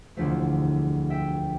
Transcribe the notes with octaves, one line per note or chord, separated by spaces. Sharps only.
E1 D2 D3 F3 A3 C5 E5
E5 G5